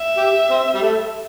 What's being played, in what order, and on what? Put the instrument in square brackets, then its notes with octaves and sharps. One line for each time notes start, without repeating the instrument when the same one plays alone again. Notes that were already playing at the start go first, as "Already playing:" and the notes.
Already playing: [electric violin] E5
[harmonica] G4
C4
G3
A3